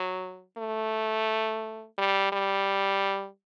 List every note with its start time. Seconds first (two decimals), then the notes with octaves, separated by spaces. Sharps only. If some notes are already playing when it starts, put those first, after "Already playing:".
Already playing: F#3
0.58 A3
1.98 G3
2.32 G3